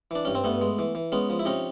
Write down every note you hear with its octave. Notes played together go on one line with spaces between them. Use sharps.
E3 D4
G2 C#4
C4
G2 A3 B3
G#3
E3
E3
G#3 B3 C#4
F3
E4
C3 C#4 D#4